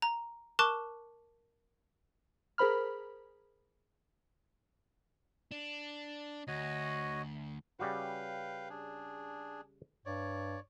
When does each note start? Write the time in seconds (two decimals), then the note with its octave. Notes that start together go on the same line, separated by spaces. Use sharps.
0.02 A#5
0.59 A#4 A5 C#6 D6 F#6 E7
2.58 G#4 A#4 C5 B5 F6
5.52 D4
6.48 D2 F#4 C#5 D#5
7.79 C#3 G3 F#4 B4 F5 G5
8.70 D4 G#4
10.06 G2 C#5 D5